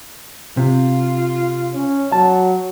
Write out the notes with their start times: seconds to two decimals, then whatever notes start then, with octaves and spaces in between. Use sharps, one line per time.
0.57 C3 F4
1.75 C#4
2.12 F#3 A5